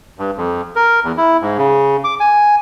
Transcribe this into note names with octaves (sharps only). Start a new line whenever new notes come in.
G2
F2
A#4
E2
E4
G#2
C#3
D6
G#5